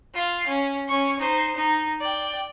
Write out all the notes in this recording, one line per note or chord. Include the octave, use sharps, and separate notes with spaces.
F4 F5
C#4
C#4 C#6
D#4 C5
D#4
D5 G5